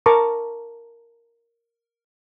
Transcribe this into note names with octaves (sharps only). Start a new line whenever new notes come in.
A#4 A5 A#5 C#6 D6